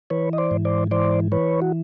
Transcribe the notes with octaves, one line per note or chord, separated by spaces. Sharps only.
E3 B4 C#5
D#5
C5 D5
G#2
C5 D5
E3 C5 D5
E3 B4 C#5
F#4